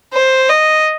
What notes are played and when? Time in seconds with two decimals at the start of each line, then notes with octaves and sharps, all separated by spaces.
0.13 C5
0.50 D#5